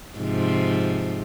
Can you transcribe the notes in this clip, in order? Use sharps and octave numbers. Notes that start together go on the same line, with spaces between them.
G#2 C3 F3